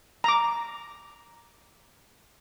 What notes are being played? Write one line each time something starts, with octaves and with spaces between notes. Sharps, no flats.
A#5 D6